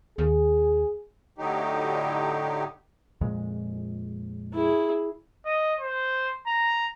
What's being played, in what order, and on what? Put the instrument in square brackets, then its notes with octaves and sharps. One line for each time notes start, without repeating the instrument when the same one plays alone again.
[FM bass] D#2 [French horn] G#4
[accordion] A2 D3 F#3 D#4 G4
[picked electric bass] F2 A#2 G#3
[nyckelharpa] E4 G#4
[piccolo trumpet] D#5
C5
A#5